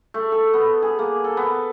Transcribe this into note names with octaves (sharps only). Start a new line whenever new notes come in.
A3
A4
B3
G#4
A#3
A4
B3